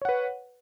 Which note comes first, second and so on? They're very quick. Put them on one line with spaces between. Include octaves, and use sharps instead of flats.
C#5 F#5 B4